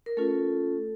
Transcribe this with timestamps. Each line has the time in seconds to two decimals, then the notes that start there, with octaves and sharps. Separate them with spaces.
0.06 A#4
0.17 A3 C#4 F4 A4